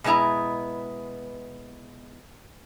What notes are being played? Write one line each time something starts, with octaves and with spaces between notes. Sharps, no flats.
B2 G#3 B3 E4 A#5